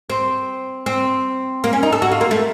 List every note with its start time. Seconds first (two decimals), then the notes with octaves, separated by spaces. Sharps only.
0.10 C4
0.86 C4
1.64 A#3
1.73 C#4
1.83 D#4
1.92 A4
2.02 F#4
2.12 F4
2.21 A#3
2.31 A3